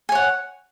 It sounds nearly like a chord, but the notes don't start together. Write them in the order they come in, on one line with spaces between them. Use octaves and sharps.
G#5 C#5 F#5